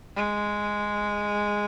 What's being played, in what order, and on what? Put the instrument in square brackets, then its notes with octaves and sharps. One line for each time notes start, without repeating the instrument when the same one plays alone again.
[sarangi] G#3